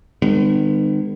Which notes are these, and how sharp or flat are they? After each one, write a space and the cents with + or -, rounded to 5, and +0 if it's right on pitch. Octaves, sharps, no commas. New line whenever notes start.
D#3 -35 G#3 -45 B3 +40